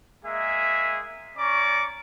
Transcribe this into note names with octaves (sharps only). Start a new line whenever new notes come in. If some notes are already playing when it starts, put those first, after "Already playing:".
G#3 A#3 G#4 E5
C#4 D5 A#5 C#6 D6